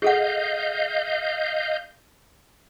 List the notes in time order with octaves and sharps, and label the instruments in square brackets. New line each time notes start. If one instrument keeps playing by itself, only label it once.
[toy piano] G#4 A4 F#5 [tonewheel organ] D#5 F5 G6